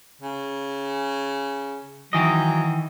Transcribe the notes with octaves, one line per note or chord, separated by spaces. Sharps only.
C#3
D#3 E3 F#3 D#5